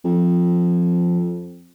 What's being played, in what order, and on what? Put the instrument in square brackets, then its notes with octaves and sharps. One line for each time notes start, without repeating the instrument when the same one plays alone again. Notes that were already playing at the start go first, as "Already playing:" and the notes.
[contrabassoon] F2 [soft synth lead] F3